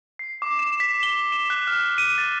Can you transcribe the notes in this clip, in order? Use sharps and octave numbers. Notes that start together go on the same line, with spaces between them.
C7
D6
E7
B6
G7
E7
F#6
F6
D#7
A6